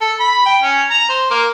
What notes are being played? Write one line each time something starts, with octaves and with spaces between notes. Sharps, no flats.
A4
B5
G5
C#4
A#5
C5
A#3